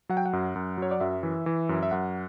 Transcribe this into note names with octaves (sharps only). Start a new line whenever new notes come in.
F#3 F#5
G5
F#5
F#2
F#2
F#3 C#5
D5
F#2 E5
E3
E3
F#2
E5
F#2 F#5